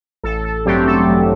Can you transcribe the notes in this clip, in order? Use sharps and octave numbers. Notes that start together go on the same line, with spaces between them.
A1 A4
A4
G2 F#3 A3 C4 G4
A4
A1